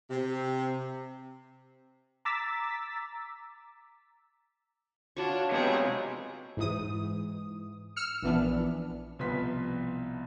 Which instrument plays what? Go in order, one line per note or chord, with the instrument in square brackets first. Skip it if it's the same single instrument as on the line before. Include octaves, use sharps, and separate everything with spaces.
[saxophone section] C3
[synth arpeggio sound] A#5 D6 E6 A6 B6
[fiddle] D4 [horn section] F4 C#5 [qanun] F#4 C#6
[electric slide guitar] C3 G#3 [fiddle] B3 G#4 [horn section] F4 C#5 [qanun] A#5
[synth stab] G#2 E3 D#6
E6 F6 C#7
A#1 E3 B3 D4
[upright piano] C2 B2 F3 B4 C6 B6